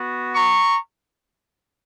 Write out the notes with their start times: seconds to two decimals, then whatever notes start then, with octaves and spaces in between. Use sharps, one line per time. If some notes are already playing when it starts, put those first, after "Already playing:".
Already playing: B3 F#4
0.35 A#5 C#6